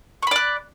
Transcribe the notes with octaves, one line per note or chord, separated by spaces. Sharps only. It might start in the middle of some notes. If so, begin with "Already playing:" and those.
D5 B5 C#6 F#6